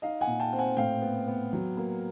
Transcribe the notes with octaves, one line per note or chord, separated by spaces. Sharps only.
D#4 D#5 F5
F#5 G#5
A#2
G5 A5
C4
F#5 G#5
A2 F5 G5
B3
B3
F#3
A#3